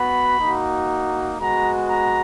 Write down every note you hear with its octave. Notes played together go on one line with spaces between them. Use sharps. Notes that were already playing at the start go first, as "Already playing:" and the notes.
Already playing: B3 F#4 B5
A#3 D#4 F#4
G#3 B3 F#4 A#5
A#5